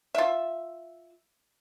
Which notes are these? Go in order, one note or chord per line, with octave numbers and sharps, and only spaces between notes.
F4 E5